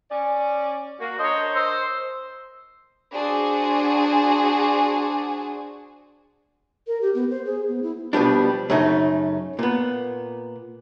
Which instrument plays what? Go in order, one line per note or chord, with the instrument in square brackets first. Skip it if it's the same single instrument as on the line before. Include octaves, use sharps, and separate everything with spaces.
[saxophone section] C#4 D5
[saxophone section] A#3 [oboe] F#4
[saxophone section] D4 A#4 D#5 [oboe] C5 [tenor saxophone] C#5
[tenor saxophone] C5 [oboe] E6
[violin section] D4 F#4 G#4 C5
[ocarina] A#4
G4
B3
C5
G#4
B3
E4
[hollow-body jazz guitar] B2 F3 G3 D4
F#2 C#3 A3 D#4
A#2 B3